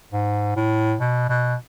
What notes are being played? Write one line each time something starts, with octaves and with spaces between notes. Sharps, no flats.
G#2
A2
B2
B2